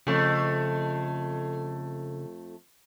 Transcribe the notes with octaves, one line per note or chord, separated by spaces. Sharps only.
F2 C#3 A3